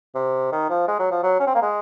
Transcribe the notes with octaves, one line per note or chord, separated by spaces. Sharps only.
C3
D#3
F3
G#3
F#3
F3
F#3
C#4
C4
A#3
G#3